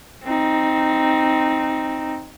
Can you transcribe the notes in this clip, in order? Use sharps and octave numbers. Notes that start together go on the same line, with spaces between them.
C4 D#4